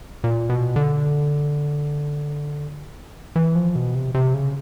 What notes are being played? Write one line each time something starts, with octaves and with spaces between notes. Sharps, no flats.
A#2
B2
D3
E3
F3
B2
C3
C3
C#3